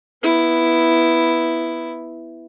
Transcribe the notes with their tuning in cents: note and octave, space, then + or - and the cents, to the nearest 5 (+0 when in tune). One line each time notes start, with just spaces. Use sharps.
B3 +0 E4 +0